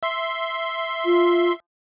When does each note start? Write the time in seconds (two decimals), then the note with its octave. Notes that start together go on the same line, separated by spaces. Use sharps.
0.03 E5 C6
1.05 F4